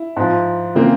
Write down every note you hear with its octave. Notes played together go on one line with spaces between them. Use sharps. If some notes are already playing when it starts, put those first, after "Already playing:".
Already playing: E4
G#2 F3
C#3 E3 A#3 C4